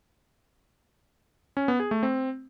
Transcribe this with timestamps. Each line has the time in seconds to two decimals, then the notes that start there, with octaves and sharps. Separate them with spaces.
1.57 C#4
1.68 B3
1.80 G#4
1.91 A3
2.03 C4